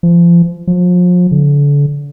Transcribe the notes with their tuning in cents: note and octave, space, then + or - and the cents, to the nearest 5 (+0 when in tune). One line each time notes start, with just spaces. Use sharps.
F3 -30
F3 +35
D3 -35